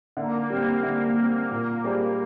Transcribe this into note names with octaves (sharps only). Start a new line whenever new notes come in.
D3 A#3
G3 C4
D3
G3 C4
A#2
G3 D4 G#4 C5